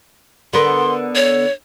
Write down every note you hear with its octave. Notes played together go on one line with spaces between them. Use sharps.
D3 B3 A#4 C6
C#5